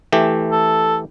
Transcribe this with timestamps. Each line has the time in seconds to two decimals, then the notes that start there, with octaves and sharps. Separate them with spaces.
0.12 E3 A3 G4
0.51 A4